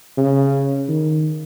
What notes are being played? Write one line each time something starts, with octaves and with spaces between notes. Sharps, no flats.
C#3
D#3